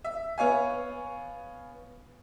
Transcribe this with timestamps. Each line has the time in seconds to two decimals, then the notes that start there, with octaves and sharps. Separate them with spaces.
0.04 E5
0.38 B3 C#5 F5 G#5